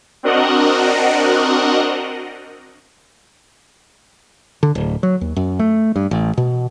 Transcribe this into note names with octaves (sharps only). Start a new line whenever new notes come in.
C4 D4 F#4 A#4 D#5 F#5
D3
D1
F#3
D#2
F#2
A3
G2
A1
B2